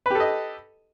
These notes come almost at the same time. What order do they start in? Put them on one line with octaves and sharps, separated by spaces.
B4 G4 A4 D#5